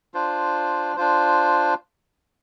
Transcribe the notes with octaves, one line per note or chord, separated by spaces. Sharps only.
D4 F4 C5
D4 F4 C5